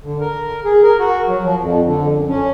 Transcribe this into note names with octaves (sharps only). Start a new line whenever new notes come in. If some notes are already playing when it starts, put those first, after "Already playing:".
D3
A#4
G#4
A#4
F#4
F#3
F3
F2
D3
F#2
C#4